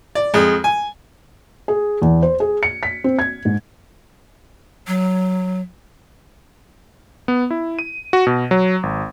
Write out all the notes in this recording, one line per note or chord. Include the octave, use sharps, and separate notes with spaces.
D5
F2 G#3
G#5
G#4
E2
C5
G#4
C#7
B6
C4
G#6
G#2
F#3
B3
E4
D#7
F#4
B2
F#3
G#1